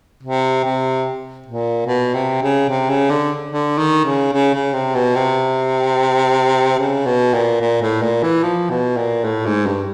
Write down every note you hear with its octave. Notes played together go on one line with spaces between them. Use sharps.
C3
C3
A#2
B2
C3
C#3
C3
C#3
D3
D3
D#3
C#3
C#3
C#3
C3
B2
C3
C#3
B2
A#2
A#2
A2
A#2
E3
F3
B2
A#2
A2
G#2
G2